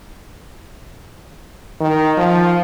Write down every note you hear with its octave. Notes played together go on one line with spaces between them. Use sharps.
D#3
F3